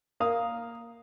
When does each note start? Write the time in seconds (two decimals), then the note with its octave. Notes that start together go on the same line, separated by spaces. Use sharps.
0.20 A#3 F5 D#6